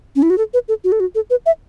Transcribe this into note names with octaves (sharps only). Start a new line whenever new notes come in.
C#4
E4
F#4
A4
B4
A4
F#4
A4
F#4
A4
B4
E5